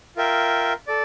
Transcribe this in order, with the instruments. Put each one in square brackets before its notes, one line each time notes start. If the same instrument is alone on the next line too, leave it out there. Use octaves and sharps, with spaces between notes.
[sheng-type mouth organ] F4 A#4 E5 G5
A4 D5